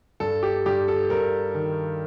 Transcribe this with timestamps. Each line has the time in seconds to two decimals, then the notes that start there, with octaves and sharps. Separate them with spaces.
0.20 G2 A4
0.43 G4
0.66 G2 G4
0.88 A4
1.10 G2 A#4
1.55 D#3